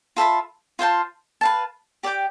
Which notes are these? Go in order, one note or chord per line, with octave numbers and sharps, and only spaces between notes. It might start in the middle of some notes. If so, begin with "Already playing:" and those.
F4 A4 E5 B5
F4 C5 F5 A5
B4 F5 A5
G4 D5 G5 D6